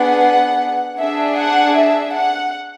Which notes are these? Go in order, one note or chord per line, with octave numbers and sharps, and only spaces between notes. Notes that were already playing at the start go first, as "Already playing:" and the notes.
Already playing: B3 D4 G#4 F#5
D4 G#4 E5
F#5
E5
F#5